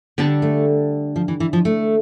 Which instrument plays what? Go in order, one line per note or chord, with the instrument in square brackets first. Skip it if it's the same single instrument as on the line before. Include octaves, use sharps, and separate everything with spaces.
[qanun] D3 G3 D4 A4 [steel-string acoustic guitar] B3
[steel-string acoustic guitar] A3
F3
E3
E3
F3
A3